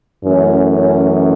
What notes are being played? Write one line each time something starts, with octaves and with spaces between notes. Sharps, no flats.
F#2 E3 A3 C#4
C#4